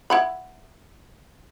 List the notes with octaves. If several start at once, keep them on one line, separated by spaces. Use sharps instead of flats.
E4 F#5 B5